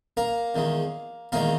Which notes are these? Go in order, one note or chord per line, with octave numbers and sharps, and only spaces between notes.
A#3 A#4
E2 D#3 G#3
E2 D#3 G#3 A#3 A#4